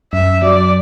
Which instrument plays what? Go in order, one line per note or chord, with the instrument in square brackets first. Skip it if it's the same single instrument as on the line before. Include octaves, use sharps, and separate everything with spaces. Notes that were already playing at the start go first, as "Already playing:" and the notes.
[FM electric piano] F#2 [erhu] E5
[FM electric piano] F#3 [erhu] D5